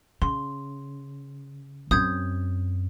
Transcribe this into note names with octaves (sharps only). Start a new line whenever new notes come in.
C#3 C6
F#2 C4 D#6 G6 G#6